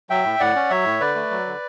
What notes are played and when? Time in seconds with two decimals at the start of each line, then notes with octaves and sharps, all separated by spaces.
0.10 F#3 E5 G5
0.24 A2
0.39 A2 D5 F#5
0.55 C#4
0.70 F#3 C#5 E5
0.85 A2
1.00 D3 B4 D5
1.15 A3
1.31 F#3
1.46 D3